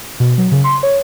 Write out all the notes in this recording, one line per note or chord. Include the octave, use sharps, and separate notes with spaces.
B2
F#3
C#3
C6
C#5